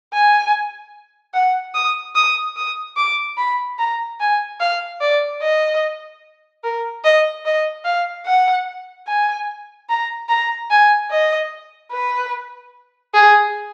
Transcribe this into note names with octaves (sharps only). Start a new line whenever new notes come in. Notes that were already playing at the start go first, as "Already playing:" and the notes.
G#5
F#5
D#6
D#6
D#6
D6
B5
A#5
G#5
F5
D5
D#5
A#4
D#5
D#5
F5
F#5
G#5
A#5
A#5
G#5
D#5
B4
G#4